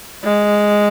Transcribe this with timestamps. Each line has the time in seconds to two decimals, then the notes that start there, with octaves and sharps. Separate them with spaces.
0.24 G#3